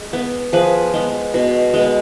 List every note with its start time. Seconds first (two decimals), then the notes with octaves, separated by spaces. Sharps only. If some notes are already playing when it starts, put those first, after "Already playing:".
Already playing: G#3
0.13 B3
0.53 F3 G#4 B4
0.94 G#3 B3
1.34 B2
1.74 G#3 B3